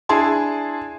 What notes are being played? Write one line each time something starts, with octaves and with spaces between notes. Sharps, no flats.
D4 E4 G#4 G#5 A5 C6